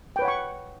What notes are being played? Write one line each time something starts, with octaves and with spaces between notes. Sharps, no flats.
B4 C#5 F#5 G5 C#6